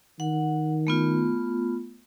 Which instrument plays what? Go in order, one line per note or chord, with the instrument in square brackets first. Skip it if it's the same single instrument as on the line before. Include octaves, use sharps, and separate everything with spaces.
[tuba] D#3 [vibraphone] F#5
[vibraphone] A3 B3 F4